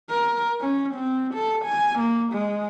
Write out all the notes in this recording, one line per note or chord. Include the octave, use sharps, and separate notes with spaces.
A#4
C#4
C4
A4
G#5
A#3
G#3